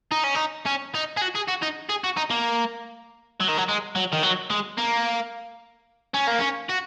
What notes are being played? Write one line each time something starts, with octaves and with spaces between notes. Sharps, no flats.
D#4
C#4
D#4
C#4
D#4
G#4
F#4
G#4
F#4
D#4
G#4
F#4
D#4
A#3
F#3
D#3
F#3
G#3
F#3
D#3
F#3
G#3
A#3
C#4
A#3
C#4
F#4